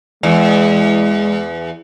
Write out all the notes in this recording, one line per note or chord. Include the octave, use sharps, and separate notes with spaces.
E2 G#3